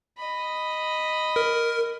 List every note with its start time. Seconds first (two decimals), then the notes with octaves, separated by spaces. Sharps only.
0.18 D#5 B5
1.36 A#4